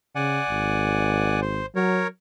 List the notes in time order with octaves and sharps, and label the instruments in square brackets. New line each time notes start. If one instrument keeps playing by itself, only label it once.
[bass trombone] C#3 [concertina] D5 F#5 G#5
[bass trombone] G#1
[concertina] C5
[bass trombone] F#3 [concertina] A#4 C#5